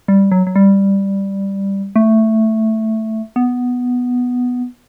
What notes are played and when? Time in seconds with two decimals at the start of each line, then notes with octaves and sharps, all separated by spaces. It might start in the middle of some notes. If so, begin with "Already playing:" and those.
0.08 G3
0.32 F#3
0.47 F#3
0.56 G3
1.96 A3
3.36 B3